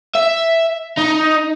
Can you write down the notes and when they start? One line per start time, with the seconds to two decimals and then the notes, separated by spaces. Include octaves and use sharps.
0.15 E5
0.98 D#4